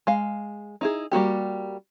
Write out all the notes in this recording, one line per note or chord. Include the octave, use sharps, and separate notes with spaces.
G#3 F5
D#4 E4 G#4
G3 A#3 F#4 G4